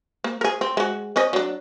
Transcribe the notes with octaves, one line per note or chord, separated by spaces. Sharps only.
A#3
G#4 A#4
C4
G#3 F#4
C4 C#4 D#5
F#3 D4